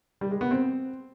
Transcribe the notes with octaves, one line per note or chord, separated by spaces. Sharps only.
G3
G#3
B3
C4